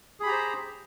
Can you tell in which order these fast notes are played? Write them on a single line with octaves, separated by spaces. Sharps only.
G#4 B5 G4 A#5 C5